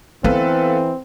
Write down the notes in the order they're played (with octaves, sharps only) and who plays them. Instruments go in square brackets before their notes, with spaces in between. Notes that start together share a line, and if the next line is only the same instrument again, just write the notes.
[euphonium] E3 [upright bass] B3 [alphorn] C4 [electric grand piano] A4 B4 F5